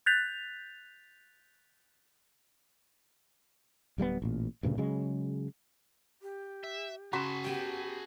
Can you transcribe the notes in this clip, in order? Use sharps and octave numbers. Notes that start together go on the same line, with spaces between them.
F#6 G6 A6 B6 F7
D1 G3 G#3 B3
A1 A#2
D2 G2 A#2 C#3
C#3 F#3 G#3
G4
E5
C#3 F#4 G#4 A5 B5 C6
B3 G4 G5